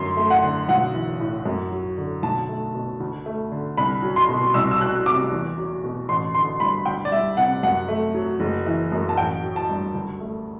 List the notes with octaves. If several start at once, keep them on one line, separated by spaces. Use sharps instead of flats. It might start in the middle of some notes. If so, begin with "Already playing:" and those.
Already playing: F#2 D3 C6
A3
F#5
D3
B1 F#5
E3
A2
F#2
F#3
D3
B1 A5
A3
B2
D2
A3
D3
C2 B5
F#3
C6
B2
C2 E6
E6
F#3 F#6
C3 D6
E2
F#3
B2
A1 C6
D3 C6
G2 B5
D2 G5
D5
G3 E5
C3 F#5
F#2 F#5
A3
F#3
F#1
E3
F#2
A5
A1 G5
F#3
A5
G2
D2
A3